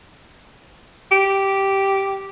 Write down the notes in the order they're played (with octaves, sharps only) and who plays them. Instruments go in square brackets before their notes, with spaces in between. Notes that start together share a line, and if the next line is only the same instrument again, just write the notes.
[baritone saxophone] G4